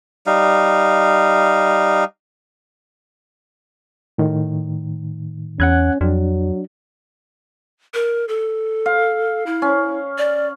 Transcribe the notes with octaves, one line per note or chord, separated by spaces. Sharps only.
G3 D#4 F5
A2 D#3
E2 C#4 F#5 F#6 G#6
F2 F#3 D4
A#4
A4
F5
E4
C#4
D5